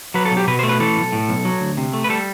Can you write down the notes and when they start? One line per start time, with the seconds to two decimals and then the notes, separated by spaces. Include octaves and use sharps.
0.14 F#3 B4
0.25 A4
0.31 B1
0.37 G4
0.47 B2 B4
0.59 C5
0.63 A3
0.69 B4
0.80 E3 A4
0.97 B1
1.12 A2
1.29 B1
1.45 F#3
1.61 D2
1.77 C3
1.93 A3
2.04 B4
2.09 G3 A4